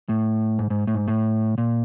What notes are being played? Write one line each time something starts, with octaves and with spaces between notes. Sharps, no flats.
A2
G#2
G#2
A2
G#2
A2
A#2